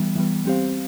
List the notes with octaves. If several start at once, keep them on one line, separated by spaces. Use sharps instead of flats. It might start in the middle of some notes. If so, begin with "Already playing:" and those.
Already playing: E3 G3 B3
E3 G3 B3
G3 C4 G4 C5 F5